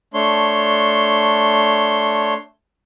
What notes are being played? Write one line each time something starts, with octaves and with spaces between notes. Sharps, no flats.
A3 D4 C#5 C6